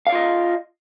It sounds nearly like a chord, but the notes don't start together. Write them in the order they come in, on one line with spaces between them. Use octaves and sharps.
F5 D5 F4 D#5